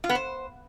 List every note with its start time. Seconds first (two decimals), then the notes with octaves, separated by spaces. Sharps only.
0.04 F4
0.09 B3
0.15 C5